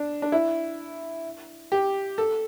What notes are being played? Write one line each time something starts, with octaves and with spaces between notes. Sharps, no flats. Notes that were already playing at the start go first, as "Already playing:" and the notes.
Already playing: D4
D4
E4
G4
A4